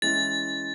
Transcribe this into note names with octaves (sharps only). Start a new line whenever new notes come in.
E3 G#3 C#4 E4 A6